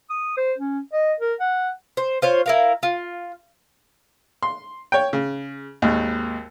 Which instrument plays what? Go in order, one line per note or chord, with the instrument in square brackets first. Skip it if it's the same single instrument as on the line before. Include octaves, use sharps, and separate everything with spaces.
[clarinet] D#6
C5
C#4
D#5
A#4
F#5
[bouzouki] C5
F4 C5 C#5
E4 A#4 F5
F4
[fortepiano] C6
C#5 G5
C#3
G#1 D#2